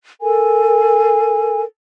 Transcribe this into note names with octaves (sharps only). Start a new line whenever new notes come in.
A4 A#4 G#5